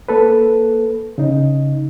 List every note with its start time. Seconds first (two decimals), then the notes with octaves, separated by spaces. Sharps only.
0.09 A#3 A4 B4
1.18 C#3 D#4